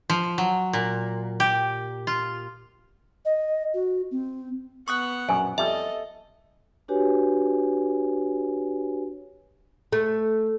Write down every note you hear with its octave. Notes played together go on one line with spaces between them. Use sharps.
F3
F#3
A#2
G4
F4
D#5
F#4
C4
B3 F#5 C#6 D#6 F#6
A#1 F#2 B2 G#5
F2 G3 A4 D#5 E5
D4 F#4 G4 B4 C#5 G#5
A3